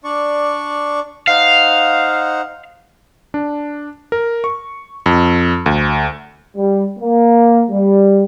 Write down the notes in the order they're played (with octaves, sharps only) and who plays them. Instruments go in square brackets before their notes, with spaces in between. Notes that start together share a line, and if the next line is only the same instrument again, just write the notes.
[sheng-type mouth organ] D4 D5 C#6
[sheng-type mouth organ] D#4 C5 F#5 [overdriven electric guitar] F5
[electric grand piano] D4
A#4
C#6
F2
D2
[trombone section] G3
A#3
G3